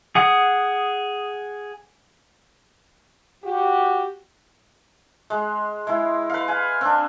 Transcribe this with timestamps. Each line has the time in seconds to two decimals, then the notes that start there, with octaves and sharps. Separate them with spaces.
0.15 G#4 F#5 D#6
3.44 F#4 G4
5.30 G#3
5.87 G#3 E4
6.30 B4 F5
6.48 F5 G#5
6.81 C4 D4